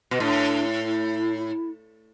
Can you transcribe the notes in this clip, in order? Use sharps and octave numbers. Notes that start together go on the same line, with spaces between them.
B2
A2 D4
E4